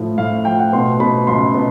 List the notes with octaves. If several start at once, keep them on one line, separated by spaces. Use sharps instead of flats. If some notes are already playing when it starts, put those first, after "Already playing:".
Already playing: A2 F3
A2 F5
F5
F3 G5
F#5
B2 C6
B2 B5
C#2 C6
B2